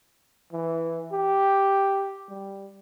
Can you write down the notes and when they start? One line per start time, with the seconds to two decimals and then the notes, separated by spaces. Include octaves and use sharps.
0.52 E3
1.12 G4
2.29 G3